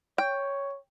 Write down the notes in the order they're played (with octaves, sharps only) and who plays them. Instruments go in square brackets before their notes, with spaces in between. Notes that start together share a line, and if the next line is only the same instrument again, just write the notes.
[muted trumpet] C#5 [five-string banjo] G5